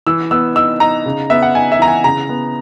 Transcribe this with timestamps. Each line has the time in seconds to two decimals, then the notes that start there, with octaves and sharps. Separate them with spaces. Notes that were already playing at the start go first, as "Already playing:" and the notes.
0.07 E3 E6
0.31 B3 E6
0.55 D#4 E6
0.80 D#4 A#5
1.06 C#3
1.30 B3 E5
1.42 F#5
1.55 D#4 G#5
1.72 E5
1.79 E3 A#5
1.88 G#5
2.04 C#3 A#5
2.29 B3